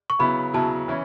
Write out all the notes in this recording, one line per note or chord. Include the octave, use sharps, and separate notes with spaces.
C#6
C#3 F#3 B3 E4 B5
C#3 F#3 B3 E4 A5
E3 C#4 E4